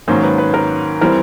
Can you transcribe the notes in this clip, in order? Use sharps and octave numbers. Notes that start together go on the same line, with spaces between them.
G#2 D#3 F#3 A#3 C#4 C5
B4
B4
A#4
E3 G3 C4 A#4